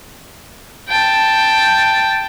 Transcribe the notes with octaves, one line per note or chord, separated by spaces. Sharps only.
G5 A5